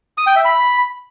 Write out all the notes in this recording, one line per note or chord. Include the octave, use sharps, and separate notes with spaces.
D#6
G5
E5
B5